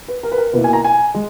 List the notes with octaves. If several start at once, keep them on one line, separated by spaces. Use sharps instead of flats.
B4
A#4
B4
A#4
B2 A#3 E4 B4
G#5
A#5
G#5
G#3